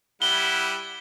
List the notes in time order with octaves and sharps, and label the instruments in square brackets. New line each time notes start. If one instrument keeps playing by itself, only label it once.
[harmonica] G3 E4 F#5 [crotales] G7